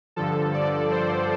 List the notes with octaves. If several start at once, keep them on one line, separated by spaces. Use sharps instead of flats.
G2 D3 F3 A4
D5
C5